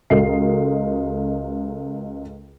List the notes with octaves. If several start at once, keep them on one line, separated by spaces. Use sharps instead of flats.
C#2 F#4 A4 A#4 D#5 C7